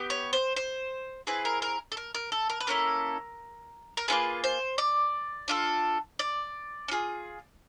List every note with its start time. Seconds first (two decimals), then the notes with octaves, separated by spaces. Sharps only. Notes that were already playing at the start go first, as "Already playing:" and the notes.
Already playing: B3 G4
0.10 C#5
0.33 C5
0.56 C5
1.27 C4 E4 G#4 B4
1.45 A#4
1.62 A#4
1.92 A4
1.97 A#4
2.15 A#4
2.32 A4
2.50 A#4
2.61 B4
2.67 A#3 C#4 E4 A4 A#4
3.97 A#4
4.08 A#3 C#4 F4 G#4 B4
4.44 C5
4.78 D5
5.48 D4 F4 A4
6.19 D5
6.88 C#4
6.91 F4 G#4